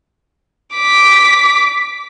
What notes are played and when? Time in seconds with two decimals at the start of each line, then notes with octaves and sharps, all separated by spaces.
0.75 D6 B6